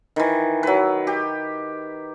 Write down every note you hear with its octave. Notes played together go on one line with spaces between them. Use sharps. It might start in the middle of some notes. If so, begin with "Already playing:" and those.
D#3 E3
F#3 B4
G4